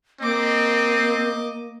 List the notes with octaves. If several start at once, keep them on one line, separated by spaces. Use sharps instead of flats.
A#3 C4 D#5 D6